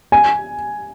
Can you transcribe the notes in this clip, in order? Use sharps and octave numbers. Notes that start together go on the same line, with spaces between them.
G#5